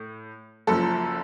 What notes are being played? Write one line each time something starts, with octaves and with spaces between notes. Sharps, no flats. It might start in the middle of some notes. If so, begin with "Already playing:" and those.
Already playing: A2
F#1 F#2 F3 A4